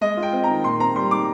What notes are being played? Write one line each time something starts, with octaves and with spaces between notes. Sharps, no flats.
G#3 D#5
F4
G5
C4
A#5
D#3
A#2 C6
C4 A#5
G3 C6
D#4 D6